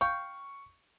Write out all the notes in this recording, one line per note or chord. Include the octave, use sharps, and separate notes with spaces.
F5 G5 C#6